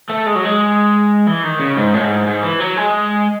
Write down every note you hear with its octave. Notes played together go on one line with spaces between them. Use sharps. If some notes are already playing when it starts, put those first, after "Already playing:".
A3
G#3
F#3
G#3
E3
D#3
C#3
G#2
A2
G#2
G#2
E3
F#3
G#3